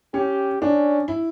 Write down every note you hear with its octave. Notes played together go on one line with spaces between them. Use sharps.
C#4 G4
C#4 D4
E4